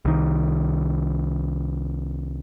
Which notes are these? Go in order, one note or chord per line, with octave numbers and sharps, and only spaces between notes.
C2 D#3